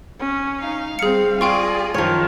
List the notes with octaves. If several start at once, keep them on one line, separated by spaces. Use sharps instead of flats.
C#4
D#4 F5
G3 C4 G#4 F5 C#7
F4 G#4 D5 D#5 F5 G5 C#6
F#2 D#3 F3 C#5